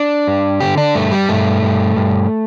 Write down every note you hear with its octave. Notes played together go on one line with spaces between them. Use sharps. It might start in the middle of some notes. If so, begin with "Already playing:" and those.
Already playing: D4
G2
D3 G4
D4
G2 A3
G3
G2 A3
G2
G2